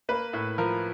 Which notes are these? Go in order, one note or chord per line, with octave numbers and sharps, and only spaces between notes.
A#3 B4
A2
F3 A#4